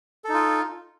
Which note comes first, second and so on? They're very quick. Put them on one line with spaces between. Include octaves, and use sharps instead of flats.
A4 D#4 F4